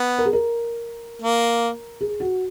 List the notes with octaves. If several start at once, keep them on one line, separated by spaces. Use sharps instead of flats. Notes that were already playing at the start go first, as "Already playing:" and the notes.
Already playing: B3
A#4
G#4
A#4
A#3
G#4
F#4